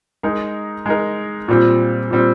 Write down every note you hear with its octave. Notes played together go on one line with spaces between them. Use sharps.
G#3 D#4 A#4
G#3 D#4 A#4
A#2 G3 C4
A#2 G3 C4